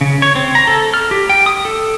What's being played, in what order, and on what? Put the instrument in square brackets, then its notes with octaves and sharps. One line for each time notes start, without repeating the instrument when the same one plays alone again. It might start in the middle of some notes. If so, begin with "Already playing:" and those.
[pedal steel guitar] C#3
C#5
C4
A#5
A4
F6
G4
G5
D#6
A4